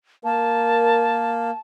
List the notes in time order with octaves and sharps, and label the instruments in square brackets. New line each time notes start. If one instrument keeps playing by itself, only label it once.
[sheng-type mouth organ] A#3 [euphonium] A#4 [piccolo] A5